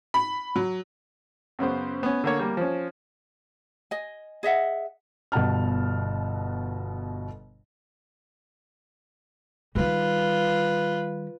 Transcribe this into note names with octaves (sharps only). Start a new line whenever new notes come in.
B5
F#3
F#2 C#3 B3 C5
B3 C#4
D3 A#3 C#5
G3 A#3
F3 C#4
D#5 G#5
G#4 D#5 E5 F#5
G1 B2 F#5 A5 F6
D#3 G3 F4 B4